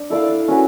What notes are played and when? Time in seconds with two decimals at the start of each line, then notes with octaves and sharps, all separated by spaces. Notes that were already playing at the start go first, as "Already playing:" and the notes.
Already playing: D4
0.10 E4 A4 D5 F5
0.48 C#4 F#4 B4